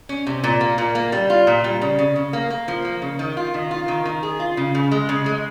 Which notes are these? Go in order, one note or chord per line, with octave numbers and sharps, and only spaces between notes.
C#4
C3
A#2
A#3
A#2
A#3
G3
F4
A#2
G3
C#3
C#3
C#3
A#3
A#3
F3
A#3
C#3
D#3
F4
D#3
F4
D#3
D#3
G#4
F4
C#3
C#3
G#3
C#3
G#3